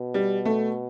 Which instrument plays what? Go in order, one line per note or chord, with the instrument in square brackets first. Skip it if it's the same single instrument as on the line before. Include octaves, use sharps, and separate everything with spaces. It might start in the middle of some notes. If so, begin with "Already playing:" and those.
Already playing: [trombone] B2
[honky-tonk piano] G3
A3